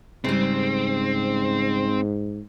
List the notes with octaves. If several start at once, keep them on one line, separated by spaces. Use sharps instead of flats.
G#2 C#3 G3 C4